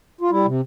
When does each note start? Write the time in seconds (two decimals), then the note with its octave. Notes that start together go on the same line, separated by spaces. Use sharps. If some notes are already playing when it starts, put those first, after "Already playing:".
0.21 F4
0.31 G3 E4
0.45 C3